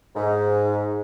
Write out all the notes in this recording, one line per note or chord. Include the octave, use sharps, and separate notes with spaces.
G#2